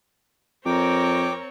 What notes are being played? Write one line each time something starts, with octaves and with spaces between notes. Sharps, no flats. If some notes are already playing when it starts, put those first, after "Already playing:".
F2 C4 A#4 C#5 G5 D6